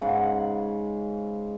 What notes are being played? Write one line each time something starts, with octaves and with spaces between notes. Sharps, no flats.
G#2 C#3 F#5